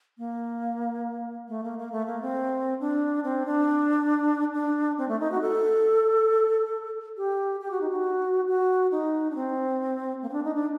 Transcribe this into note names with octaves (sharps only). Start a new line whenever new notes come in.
A#3
A3
A#3
A#3
A3
A#3
C4
D4
C4
D4
D4
C4
A3
D#4
F#4
A4
G4
G4
F#4
D#4
F#4
F#4
D#4
D4
C4
A#3
C4
D4
D#4
D4